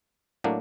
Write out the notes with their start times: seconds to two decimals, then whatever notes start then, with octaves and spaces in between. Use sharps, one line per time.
0.44 A2 F#3 A#3 D4